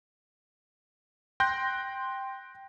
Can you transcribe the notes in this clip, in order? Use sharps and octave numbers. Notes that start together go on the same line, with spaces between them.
G5 C6 F#6 G6 A#6